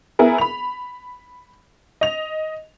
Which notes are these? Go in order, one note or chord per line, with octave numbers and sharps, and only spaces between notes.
B3 E4 G#4 A#4
B5 F7
D#5 F7